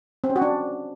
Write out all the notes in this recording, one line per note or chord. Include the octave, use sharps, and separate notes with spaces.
C4
C#4
F#4
D4